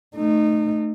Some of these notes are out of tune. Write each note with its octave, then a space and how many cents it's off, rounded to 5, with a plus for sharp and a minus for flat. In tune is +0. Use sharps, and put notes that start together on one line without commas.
A3 +0 D#4 -25